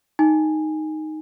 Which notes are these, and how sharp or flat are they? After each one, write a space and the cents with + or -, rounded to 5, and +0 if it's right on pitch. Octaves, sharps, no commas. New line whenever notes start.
D#4 +0 G#5 -10